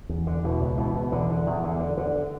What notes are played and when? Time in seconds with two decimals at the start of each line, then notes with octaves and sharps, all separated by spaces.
0.09 E2
0.27 D3
0.44 B2 E3
0.61 C#2
0.78 B2 E3
0.95 B2
1.12 E2 D3
1.30 D3
1.47 E2
1.64 D3
1.80 D3
1.97 D3